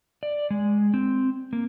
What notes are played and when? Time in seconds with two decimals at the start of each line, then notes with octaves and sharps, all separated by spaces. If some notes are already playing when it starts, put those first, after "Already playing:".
0.23 D5
0.51 G#3
0.94 C4
1.53 A#3